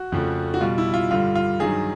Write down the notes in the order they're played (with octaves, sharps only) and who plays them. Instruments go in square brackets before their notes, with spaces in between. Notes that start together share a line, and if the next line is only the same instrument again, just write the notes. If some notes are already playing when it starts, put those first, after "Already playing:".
Already playing: [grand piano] F#4
F2 C#3 F3 A3
F#4
B2 G3 F4
E4
F4
G2 D3 G3 F4
F4
G2 D#3 F#3 G#4